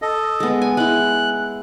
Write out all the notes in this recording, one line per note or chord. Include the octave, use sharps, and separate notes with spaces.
A4 D#5
G#3 B3
G#5
G#3 E4 F#6